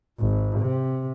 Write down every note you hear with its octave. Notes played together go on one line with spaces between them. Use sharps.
G#1
C3